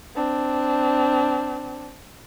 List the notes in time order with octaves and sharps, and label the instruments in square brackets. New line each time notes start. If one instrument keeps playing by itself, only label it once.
[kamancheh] C4 D4